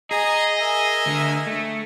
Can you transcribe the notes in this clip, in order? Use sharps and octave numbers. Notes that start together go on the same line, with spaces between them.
G#4 D#5 G#5 A#5
A#4 E5 G#5
D2 D3
A3